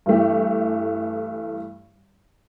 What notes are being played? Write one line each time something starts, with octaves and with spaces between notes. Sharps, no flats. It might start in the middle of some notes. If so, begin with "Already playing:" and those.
G2 E3 A3 G4